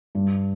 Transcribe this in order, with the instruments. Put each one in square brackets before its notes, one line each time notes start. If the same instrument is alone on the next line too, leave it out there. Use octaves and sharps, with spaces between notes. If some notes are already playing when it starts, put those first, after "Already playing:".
[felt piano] G2